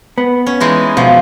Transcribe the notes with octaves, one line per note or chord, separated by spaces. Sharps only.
B3
C#4
E3 G#3 D#4
B2 F3